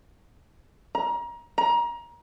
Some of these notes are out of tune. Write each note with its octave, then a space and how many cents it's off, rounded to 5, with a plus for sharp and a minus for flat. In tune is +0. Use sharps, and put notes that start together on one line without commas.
A#5 +30
A#5 +25